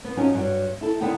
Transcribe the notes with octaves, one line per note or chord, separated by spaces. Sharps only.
B3
F3 F#3 C#4 D#4 G#5
G2 F#3
E4 A4
D3 B3 D#4 E4 G5